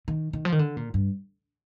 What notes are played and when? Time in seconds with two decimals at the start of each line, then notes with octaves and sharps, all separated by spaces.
0.08 D#3
0.33 D#3
0.45 F3
0.52 D#3
0.59 D3
0.77 A#2
0.94 G2